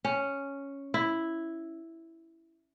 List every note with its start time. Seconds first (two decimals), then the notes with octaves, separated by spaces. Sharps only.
0.05 C#4
0.94 E4